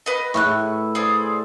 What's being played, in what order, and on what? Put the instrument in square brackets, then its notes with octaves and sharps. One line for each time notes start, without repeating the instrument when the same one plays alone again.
[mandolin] B4 D#5
[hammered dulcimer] A2 E4 B4 [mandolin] C#6 F6 F#6
[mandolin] G#4 C5 D5